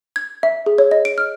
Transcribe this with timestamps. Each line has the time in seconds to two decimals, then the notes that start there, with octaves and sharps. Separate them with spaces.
0.16 G#6
0.43 E5
0.66 G#4
0.78 C#5
0.91 D#5
1.05 D7
1.18 F6